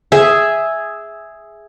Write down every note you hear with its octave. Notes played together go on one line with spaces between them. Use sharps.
G#4 E5